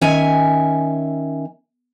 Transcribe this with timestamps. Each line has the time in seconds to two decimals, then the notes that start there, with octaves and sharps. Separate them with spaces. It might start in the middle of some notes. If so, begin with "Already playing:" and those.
0.01 D#3 C#4 E5 G#5